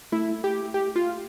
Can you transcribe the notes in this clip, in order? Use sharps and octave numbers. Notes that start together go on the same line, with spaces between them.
A3 E4
G4
G4
F4